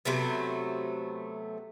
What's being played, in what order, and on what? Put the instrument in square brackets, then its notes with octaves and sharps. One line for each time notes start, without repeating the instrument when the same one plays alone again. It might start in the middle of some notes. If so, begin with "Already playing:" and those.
[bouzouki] C3 F#3 A3 B3